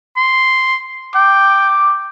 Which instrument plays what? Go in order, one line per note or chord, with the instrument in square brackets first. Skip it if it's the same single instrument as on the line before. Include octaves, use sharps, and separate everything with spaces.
[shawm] C6
[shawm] G5 [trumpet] D6